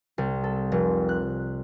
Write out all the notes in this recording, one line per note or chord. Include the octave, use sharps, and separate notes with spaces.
C2
A4
F1
F#6